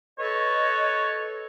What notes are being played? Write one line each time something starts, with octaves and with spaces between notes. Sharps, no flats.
A4 B4 C#5 D#5